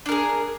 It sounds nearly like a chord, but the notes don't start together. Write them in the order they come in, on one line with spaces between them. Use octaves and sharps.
D4 A#4 G#4